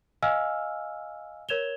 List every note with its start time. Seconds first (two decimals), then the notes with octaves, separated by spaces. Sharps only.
0.23 D#5 F5 G#5 E6 F6
1.49 A#4 C#5 G#6 E7 F7 G7